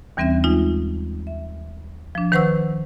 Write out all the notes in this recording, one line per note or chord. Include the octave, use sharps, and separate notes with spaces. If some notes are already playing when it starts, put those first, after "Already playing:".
D#2 E3 G3 C4 C#4 E5
G#3 D#4 F4
E5
F3 D4
D#3 B4 C5 F#5 C#6 E6